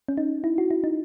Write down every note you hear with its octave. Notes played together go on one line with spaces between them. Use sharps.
C#4
D#4
E4
F#4
E4
D#4